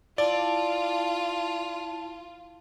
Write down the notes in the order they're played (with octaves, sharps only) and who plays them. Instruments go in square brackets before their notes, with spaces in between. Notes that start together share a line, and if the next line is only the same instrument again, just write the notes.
[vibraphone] E4 A5 [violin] F4 [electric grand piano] D5